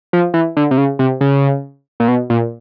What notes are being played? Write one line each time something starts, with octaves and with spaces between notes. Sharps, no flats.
F3
E3
D3
C3
C#3
C3
C#3
A#2
B2
A#2